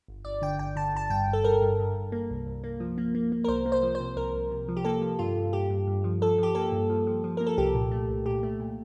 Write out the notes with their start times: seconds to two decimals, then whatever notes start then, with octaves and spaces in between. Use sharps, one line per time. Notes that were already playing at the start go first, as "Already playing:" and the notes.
0.08 G1
0.25 G1 D5
0.42 D3 G5
0.59 G1 G5
0.76 D3 A5
0.94 G1 A5
1.10 G2 G5
1.28 G1
1.33 A4
1.44 G2 A#4
1.62 G2
1.79 G2
1.95 G2
2.12 A#3
2.30 C2
2.47 C2
2.64 A#3
2.80 F3
2.98 A#3
3.15 A#3
3.32 A#3
3.44 A#4
3.48 C2 C5
3.66 A#3
3.72 C5
3.83 F3
3.95 C5
4.00 C3
4.16 C2 A#4
4.33 C2
4.51 C3
4.68 F3
4.77 G4
4.85 A#3 A4
5.02 F3
5.19 G2 F4
5.37 G2
5.53 G2 G4
5.70 G2
5.87 G2
6.04 F3
6.22 F3 A4
6.38 F3 G4
6.55 A#3 A4
6.72 G2
6.89 F3
7.07 F3
7.24 F3
7.37 A#3 A#4
7.47 A4
7.58 C2 G4
7.75 A#2
7.91 A3
8.09 C2
8.26 A#2 G4
8.43 A3
8.60 A#2